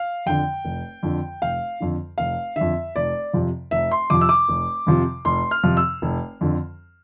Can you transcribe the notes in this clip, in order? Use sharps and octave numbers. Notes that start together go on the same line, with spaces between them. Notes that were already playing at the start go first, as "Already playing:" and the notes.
Already playing: F5
F2 D3 G5
F1
F2 D3
F1 F5
F2 D3
F1 F5
F2 D3 E5
F1 D5
F2 C3 F3
F1 E5
C6
F2 C3 F3 D6
E6
D6
F1
F2 C3 F3
F1 C6
F6
F2 C3 F3
E6
F1
F2 D3